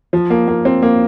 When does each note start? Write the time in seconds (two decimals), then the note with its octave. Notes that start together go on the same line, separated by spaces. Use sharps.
0.13 F3
0.30 A#3
0.48 A#3
0.65 C4
0.82 A#3